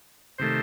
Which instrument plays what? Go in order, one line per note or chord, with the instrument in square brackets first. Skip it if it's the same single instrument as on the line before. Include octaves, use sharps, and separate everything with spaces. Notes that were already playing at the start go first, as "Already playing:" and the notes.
[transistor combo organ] C3 D#3 A3 C5